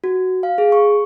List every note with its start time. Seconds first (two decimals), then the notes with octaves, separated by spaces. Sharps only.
0.04 F#4
0.43 F5
0.58 G#4
0.72 C#6